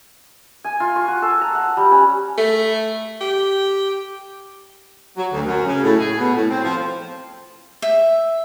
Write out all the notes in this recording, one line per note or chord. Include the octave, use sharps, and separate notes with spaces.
G#5
F4
C#6
F#4
A4
A#5
F#5
G3
C#4
A3
G4
F#3
D2
F#2
C#3
A2
G#4
B2
A2
C4
F3
E5